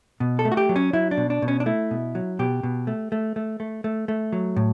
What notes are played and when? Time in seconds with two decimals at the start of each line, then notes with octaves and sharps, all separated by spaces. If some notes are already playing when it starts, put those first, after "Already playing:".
0.20 B2
0.39 A4
0.45 A3
0.52 F#4
0.57 G4
0.69 F#3
0.76 C#4
0.93 F#3 E4
1.11 D4
1.17 B2
1.30 D4
1.42 B2
1.48 C#4
1.60 D4
1.66 A3 E4
1.91 B2
2.15 F#3
2.39 B2 G4
2.63 B2
2.87 A3
3.12 A3
3.36 A3
3.60 A3
3.84 A3
4.08 A3
4.33 F#3
4.56 A2